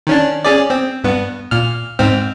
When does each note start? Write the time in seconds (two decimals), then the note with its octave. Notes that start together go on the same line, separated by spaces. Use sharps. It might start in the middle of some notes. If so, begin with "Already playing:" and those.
0.07 D#3 C#4 D4
0.44 C#4 G#4 D5
0.70 C4
1.04 G2 B3
1.51 A#2 F6
1.99 G#2 C4 F6